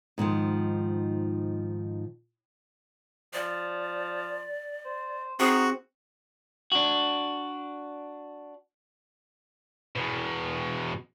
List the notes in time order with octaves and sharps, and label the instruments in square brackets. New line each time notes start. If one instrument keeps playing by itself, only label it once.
[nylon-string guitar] G#2 D3 D#3 F3
[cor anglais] F3 [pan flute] D5
[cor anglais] C5
[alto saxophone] C4 [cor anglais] D#4 [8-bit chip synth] F#4 [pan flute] G#4
[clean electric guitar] D4 F#4
[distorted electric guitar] E2 B2